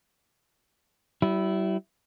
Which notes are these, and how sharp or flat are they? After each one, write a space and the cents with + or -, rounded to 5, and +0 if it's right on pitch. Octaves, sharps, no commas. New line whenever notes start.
G3 -40 E4 +0